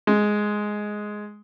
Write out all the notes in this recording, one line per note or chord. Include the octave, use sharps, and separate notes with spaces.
G#3